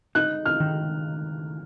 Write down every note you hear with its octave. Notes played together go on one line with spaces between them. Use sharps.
D#4 F#6
F6
D#3